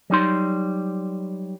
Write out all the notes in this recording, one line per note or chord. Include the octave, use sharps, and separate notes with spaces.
F#3 G3 D#4 C6